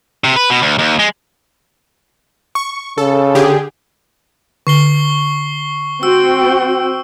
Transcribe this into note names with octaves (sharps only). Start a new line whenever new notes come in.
C3
B4
B2
D2
D#2
G#3
C#6
C#3 A4
D3 G4 G#4
D3 C#6 C7 G7
C4 F#4 G5 E6